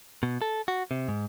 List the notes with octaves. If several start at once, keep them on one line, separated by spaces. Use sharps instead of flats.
B2
A4
F#4
C3
G#2